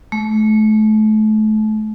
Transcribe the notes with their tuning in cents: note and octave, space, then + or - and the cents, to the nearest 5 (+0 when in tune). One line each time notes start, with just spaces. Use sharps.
A3 -35